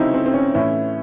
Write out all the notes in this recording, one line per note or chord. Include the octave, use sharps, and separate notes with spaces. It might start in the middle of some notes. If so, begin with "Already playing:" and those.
Already playing: C#3 F#3 C4 C#4 D#4 E4
C4
C4
C#4
A2 E3 C#4 E4